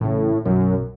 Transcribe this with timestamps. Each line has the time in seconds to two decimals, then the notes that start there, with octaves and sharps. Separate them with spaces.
0.01 A1 A2 C#3
0.45 B1 F#2 F#3